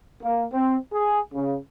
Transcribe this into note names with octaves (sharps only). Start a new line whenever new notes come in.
A#3
C4
G#4
C#3